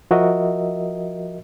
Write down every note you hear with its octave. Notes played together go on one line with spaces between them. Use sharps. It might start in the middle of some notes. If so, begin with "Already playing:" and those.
F3 F#4 A#4 D#5 E5